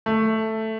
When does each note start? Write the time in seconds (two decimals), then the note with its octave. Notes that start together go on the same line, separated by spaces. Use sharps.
0.06 A3